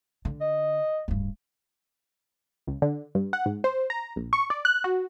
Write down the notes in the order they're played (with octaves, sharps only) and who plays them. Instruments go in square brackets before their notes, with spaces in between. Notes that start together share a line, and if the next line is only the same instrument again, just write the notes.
[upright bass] D3
[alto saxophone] D#5
[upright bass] D1 G2
[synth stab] C#2
D3
G2
F#5
G#2
C5
A#5
A#1
C#6
D5
F#6
F#4